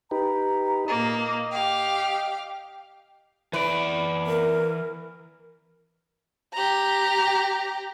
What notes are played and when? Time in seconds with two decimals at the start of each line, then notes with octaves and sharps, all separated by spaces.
0.11 D#4 G4 B4 A#5
0.86 A#2 A#3 D#5
1.52 G4 F5 G5
3.53 E3 B4 D5
4.27 A#4
6.54 G4 A#5